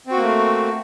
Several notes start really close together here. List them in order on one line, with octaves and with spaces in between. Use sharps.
C4 F#4 A#3 A3